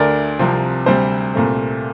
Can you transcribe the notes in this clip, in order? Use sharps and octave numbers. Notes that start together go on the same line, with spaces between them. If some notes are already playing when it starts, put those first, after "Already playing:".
Already playing: D2 D3 A3 A#4 D5
C2 C3 F3 C4
D2 C3 G3 C4 C5
C2 A#2 A3 C4